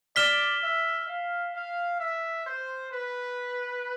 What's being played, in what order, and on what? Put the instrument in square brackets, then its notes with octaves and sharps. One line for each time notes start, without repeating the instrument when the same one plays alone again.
[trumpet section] D5 [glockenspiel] F6 B6 E7 G7
[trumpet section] E5
F5
F5
E5
C5
B4